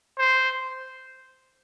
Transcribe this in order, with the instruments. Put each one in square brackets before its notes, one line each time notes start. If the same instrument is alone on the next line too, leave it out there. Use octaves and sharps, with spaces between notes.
[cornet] C5